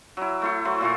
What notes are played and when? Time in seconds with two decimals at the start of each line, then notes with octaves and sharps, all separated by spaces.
0.17 F#3 E4
0.42 A3 E4 C#6
0.65 F#3 A3 C5
0.81 A#2 F4 A#4 C#6